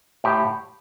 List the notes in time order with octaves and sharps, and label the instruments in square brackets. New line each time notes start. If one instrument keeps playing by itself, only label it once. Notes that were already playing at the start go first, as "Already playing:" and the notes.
[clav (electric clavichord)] A2 G4